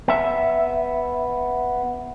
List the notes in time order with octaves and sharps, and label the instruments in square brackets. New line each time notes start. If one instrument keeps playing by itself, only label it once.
[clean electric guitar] B3 E5